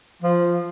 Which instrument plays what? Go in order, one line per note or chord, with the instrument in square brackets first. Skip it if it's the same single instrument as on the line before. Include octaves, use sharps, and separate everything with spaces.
[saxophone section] F3